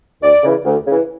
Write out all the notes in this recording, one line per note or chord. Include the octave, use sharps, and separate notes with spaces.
D2 D5
C#3 E3
D2
C#3 E3